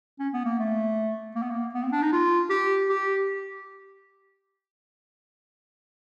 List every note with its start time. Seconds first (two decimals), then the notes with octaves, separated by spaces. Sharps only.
0.19 C#4
0.33 B3
0.45 A#3
0.59 A3
1.36 A#3
1.42 B3
1.51 A#3
1.74 B3
1.83 C4
1.92 D4
2.02 D#4
2.13 F4
2.50 G4
2.89 G4